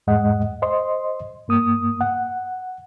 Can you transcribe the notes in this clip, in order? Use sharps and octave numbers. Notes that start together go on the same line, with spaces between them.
E2 G#2 G#3 D#5 F#5
C5 D#5 C6
G2 A#3 D#6
F#5